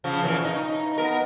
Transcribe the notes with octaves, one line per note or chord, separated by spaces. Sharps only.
C#3 F3
A#2 C#3 E3
D#4
B3 A#4